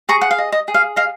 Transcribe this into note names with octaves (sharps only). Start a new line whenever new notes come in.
G#4 A#5 C#6
F#5
F5
D#5
D#5
G#4
F5
D#5 F5